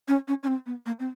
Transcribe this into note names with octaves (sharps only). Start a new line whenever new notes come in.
C#4
C#4
C#4
C4
B3
A#3
C4